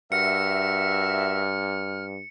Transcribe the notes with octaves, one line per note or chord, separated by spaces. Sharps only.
G2 F#4 A#4 E5 F6 C#7